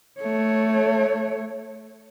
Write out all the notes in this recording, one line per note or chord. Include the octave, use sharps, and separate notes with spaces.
A3 C#5